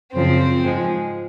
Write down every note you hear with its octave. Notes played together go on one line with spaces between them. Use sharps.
F#2 C#3 F3 C4 C5
G#2 F3 G#3